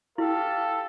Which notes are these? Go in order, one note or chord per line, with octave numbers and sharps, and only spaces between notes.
E4 G4 A4 F5